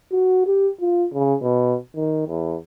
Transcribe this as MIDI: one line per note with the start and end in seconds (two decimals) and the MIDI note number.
0.12 0.46 66
0.47 0.69 67
0.81 1.06 65
1.13 1.35 49
1.43 1.77 47
1.96 2.26 51
2.28 2.56 40